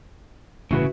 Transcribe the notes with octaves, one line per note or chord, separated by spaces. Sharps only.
G1 A2 C#3 E3 E4 F#4 B4